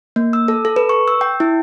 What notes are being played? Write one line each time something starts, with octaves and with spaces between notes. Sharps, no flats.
A#3
E6
A4
A4
B4
C#6
E6
G5
E4